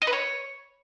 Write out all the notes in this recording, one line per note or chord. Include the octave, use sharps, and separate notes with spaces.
D#5
B4
C#5